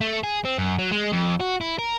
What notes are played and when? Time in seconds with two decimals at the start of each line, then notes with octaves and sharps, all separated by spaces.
0.01 A3
0.24 G#4
0.45 C4
0.58 F#2
0.78 F#3
0.91 G#3
1.12 F2
1.40 F#4
1.61 E4
1.79 A#4